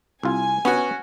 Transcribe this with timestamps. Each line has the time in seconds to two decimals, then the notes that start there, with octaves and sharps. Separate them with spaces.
0.23 C2 F4 G#5
0.65 B3 C#4 F#4